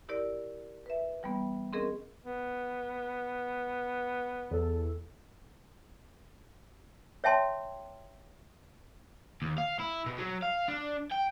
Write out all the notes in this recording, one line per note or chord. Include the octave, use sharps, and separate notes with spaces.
E4 G4 A#4 D5
B4 E5
E3 G3 A#3 B3
C4 C#4 G#4 A#4 D#5
B3
E2 A4
C#5 E5 G5 A5 C6
D#2
F5
E4
B2
F#3
F5
D4
G5